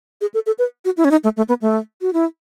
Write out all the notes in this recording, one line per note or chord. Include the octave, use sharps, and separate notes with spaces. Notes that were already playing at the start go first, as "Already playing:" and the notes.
G#4
A4
A4
B4
F#4
E4
C#4
D#4
A3
A3
B3
A3
F#4
E4